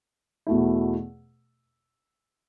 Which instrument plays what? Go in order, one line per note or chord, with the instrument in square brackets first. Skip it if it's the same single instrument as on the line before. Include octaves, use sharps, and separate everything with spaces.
[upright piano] E2 B2 A3 E4